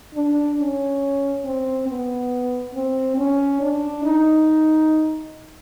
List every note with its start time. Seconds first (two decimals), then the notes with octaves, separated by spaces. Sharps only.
0.15 D4
0.59 C#4
1.45 C4
1.88 B3
2.75 C4
3.17 C#4
3.61 D4
4.04 D#4